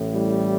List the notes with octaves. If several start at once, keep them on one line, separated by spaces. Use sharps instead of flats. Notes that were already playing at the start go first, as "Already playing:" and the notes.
Already playing: A1 A2
G3